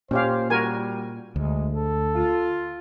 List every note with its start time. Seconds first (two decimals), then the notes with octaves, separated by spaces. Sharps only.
0.11 A#2 C#4 G4 C5 F5
0.50 G3 F#4 A#4 G#5
1.36 D2 G#3
1.74 A4
2.15 F4